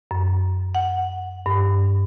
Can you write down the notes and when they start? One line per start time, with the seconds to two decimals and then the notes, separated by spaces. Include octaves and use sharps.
0.11 F#2
0.75 F#5
1.46 G2